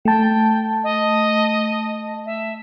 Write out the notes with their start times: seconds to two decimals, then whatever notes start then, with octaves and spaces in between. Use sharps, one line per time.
0.05 A3 G5 A5
0.84 D#5
2.26 E5